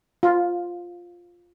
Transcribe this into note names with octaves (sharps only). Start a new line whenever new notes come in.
F4